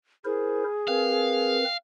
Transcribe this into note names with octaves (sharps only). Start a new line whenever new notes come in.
E4 G#4 A#4 C5
C4 A#4 B4 F5